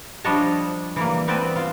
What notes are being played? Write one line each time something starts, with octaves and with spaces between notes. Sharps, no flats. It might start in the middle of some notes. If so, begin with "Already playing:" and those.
F3 G3 D4 C#5 D#5 A5
E3 G3 A#3
B3 C4 B4 D5 G5 A5
F4